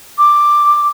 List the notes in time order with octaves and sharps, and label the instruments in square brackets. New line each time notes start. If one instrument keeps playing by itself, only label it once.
[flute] D6